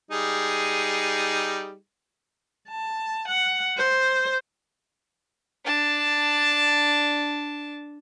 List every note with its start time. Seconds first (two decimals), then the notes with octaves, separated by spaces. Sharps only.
0.11 G3 D#4 G#4
2.69 A5
3.28 F#5
3.77 C5
5.65 D4 A5